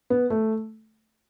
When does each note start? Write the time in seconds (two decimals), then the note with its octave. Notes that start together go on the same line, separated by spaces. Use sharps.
0.10 B3
0.30 A3